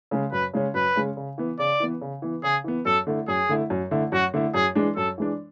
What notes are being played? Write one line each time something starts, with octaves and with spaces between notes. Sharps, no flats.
C#3 G#3 C#4
F#2 B4
C#3 G#3 C#4
F#2 B4
C#3 G#3 C#4
C#3
E3 B3
C#3 D5
E3 B3
C#3
E3 B3
C#3 G#4
E3 B3
F#2 A4
D3 A3 E4
F#2 G#4
D3 A3 E4
F#2
D3 A3 E4
F#2 F#4
D3 A3 E4
F#2 G#4
E3 G#3 D4
F#2 A4
E3 G#3 D4